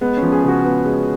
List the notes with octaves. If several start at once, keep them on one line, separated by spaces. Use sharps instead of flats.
G#3 B3
C#4
F3
G#4
C#3 F#4
B3
G#3